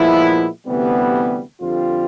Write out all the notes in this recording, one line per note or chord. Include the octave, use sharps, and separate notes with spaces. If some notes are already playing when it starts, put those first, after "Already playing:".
Already playing: A#2 F3 G#3 B3 E4
D2 C3 E3 G3 B3
F2 D3 G3 C4 F4